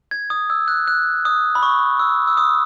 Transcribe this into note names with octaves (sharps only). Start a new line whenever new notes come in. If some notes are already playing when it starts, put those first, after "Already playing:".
G#6
D#6
E6
F#6
F#6
D#6
B5
C#6
E6
E6
D#6